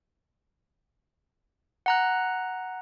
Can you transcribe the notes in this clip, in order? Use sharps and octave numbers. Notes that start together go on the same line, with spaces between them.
F#5 A#5 F#6